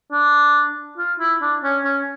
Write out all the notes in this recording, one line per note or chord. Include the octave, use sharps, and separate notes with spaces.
D4
F4
E4
D4
C#4
C#4